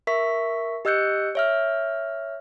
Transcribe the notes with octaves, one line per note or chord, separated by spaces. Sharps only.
A#4 E5 C#6 B6
G4 D#5 E6 F#6 G6 C#7
C#5 E5 F6